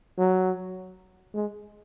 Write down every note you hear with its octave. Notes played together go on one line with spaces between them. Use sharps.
F#3
G#3